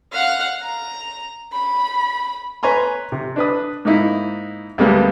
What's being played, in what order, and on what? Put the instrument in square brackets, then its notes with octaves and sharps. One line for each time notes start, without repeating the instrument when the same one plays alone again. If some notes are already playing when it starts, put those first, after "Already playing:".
[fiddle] F5 F#5
A#5
B5
[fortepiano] B4 C#5 G#5 A#5 C6
C3
D4 B4 D#6
G#2 A#3 D#4 E4
D2 G3 G#3 A#3 B3